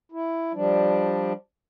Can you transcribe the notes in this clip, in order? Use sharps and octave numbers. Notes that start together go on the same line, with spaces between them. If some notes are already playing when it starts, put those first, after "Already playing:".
E4
F3 G3 D4